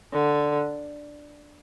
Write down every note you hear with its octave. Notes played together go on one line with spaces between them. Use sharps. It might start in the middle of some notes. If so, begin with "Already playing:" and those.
D3